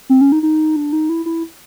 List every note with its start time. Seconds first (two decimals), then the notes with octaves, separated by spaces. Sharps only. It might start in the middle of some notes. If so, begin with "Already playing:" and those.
0.09 C4
0.21 C#4
0.32 D#4
0.43 D#4
0.76 D4
0.93 D#4
1.09 E4
1.26 E4